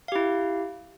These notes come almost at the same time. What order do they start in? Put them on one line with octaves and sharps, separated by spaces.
F5 G4 E4